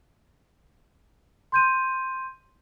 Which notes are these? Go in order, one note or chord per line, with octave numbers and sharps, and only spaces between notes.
C6 G6 D#7